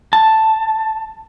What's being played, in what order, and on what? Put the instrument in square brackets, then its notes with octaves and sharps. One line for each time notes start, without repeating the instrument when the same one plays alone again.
[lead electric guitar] A5